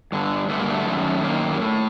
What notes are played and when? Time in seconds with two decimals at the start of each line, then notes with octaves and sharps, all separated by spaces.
0.12 G2 D3
0.49 G2 D3 A3
0.60 A#3
0.70 A3
0.86 F#2 D#3
1.23 F#2 D#3 A#3
1.54 G3
1.60 A2 A3